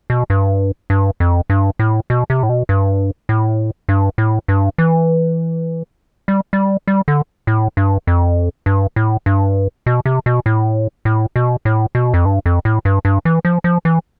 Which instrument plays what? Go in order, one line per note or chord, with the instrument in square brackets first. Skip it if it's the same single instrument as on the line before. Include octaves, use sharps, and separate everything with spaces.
[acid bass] B2
G2
G2
F2
G2
A2
B2
C3
A2
B2
G2
A2
G2
A2
G2
E3
G3
G3
G3
D3
A2
G2
F2
G2
A2
G2
B2
C3
B2
A2
A2
B2
A2
B2
F2
G2
F2
A2
G2
G2
E3
F3
F3
E3